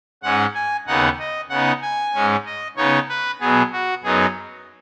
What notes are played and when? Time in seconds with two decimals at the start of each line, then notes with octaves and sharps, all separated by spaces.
0.23 G#2 G#3 C#4 F#5
0.55 G#5
0.87 D#2 C#3 B3 D#4 F#5
1.19 D#5
1.50 C#3 B3 D#4 F#5
1.82 G#5
2.14 G#2 G#3 C#4
2.45 D#5
2.77 C#3 B3 D#4 C#5
3.09 B4
3.40 B2 F#3 B3 G#4
3.72 F#4
4.03 F#2 F#3 B3 D#4 G#4